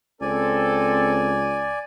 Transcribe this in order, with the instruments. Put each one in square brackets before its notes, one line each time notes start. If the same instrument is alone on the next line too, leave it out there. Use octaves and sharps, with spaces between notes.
[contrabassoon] C#2 [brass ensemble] C4 A4 [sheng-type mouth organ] D5 G#5